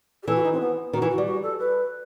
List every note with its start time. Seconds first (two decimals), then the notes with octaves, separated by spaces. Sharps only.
0.23 G4
0.26 E3 A4
0.35 F#4
0.43 D#4
0.52 C4
0.60 B3
0.93 D#3 F#4
1.02 E3
1.10 F#4
1.18 G3
1.26 F#4
1.42 A4
1.59 B4